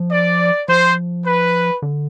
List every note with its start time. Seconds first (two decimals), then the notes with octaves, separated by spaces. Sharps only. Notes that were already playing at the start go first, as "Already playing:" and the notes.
Already playing: F3
0.12 D5
0.68 F3 C5
1.25 B4
1.82 D3